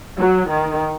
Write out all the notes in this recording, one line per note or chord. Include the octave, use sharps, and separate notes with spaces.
F#3
D#3